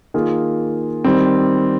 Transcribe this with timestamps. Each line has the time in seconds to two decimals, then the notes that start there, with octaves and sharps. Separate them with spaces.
0.14 D#3 A#3 F4 G#4
1.04 D#3 G3 C4